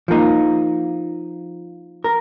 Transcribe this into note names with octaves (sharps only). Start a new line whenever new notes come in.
F3 A#3 D#4
A#4